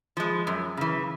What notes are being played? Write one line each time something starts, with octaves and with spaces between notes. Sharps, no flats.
F3 G#3
F#2
C#3 E3